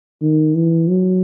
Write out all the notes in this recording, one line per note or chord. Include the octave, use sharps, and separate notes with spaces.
D#3
E3
F#3